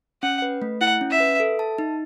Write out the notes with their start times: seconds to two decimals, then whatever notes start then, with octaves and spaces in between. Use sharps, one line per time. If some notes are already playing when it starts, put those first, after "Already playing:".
0.22 C#4 F#5
0.42 B4
0.62 A3
0.81 E4 F#5
1.01 C#4
1.10 E5
1.20 B4
1.40 A4
1.59 A5
1.78 D#4